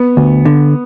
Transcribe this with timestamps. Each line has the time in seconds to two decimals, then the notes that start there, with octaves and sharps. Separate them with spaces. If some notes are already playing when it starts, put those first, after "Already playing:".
Already playing: B3
0.17 D2
0.45 D3